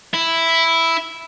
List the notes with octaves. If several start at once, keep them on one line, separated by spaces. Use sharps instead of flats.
E4